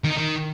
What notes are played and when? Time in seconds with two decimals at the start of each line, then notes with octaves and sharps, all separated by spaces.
0.04 D#3
0.10 D#4
0.17 D#3